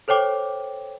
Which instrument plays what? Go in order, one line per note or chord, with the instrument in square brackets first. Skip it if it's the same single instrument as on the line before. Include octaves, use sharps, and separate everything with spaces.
[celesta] A4 C5 C#5 G5 D6